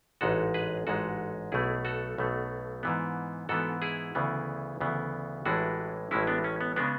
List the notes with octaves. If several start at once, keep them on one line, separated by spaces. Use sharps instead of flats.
A1 G#2 G#3 F#4 A4
G#4 B4
A1 G#2 G#3 F#4 A4
B1 B2 A3 E4 G#4
F#4 A4
B1 B2 A3
G#2 E3 B3
G#2 E3 B3 F#4 A4
E4 G#4
D2 C#3 E3 B3
D2 C#3 E3 B3
A1 A2 E3 G#3 D4 F#4
A1 A2 E3 G#3 C#4 E4
B3 D4
C#4
B3
C#3 G#3 B3 D4